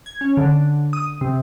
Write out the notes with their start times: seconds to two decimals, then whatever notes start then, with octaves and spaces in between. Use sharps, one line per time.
0.06 G#6
0.21 C#4
0.37 D3
0.93 D#6
1.21 C3